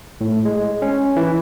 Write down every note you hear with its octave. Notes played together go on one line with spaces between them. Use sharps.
A2
G#3
C#4
E3